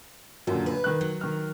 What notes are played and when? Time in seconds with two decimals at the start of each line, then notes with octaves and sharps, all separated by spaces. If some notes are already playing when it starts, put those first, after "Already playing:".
0.47 F#2 A#2 D3 G4
0.66 B4
0.84 D#3 F#6
1.01 F#3
1.21 D#3 F6